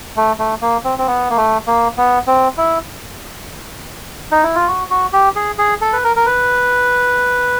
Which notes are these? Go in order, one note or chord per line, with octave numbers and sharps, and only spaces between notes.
A3
A3
A#3
C4
C4
B3
A#3
A3
A#3
B3
C4
E4
D#4
E4
F4
F#4
F#4
G4
G#4
G#4
A4
B4
A#4
A#4
B4